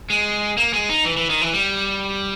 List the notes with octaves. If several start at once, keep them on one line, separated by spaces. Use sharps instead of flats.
G#3
A#3
G#3
D#4
E3
E3
D#3
E3
G3